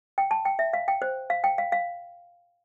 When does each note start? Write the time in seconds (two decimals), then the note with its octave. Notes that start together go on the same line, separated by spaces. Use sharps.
0.18 G5
0.31 A5
0.45 G5
0.59 E5
0.73 F5
0.88 G5
1.02 C5
1.30 F5
1.44 G5
1.58 F5
1.72 F5